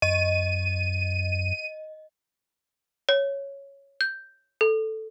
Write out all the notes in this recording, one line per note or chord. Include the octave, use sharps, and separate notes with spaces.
F#2 D#5 D#7
C#5
G6
A4